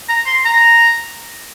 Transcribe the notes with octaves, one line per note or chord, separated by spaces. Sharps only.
A#5
C6
A#5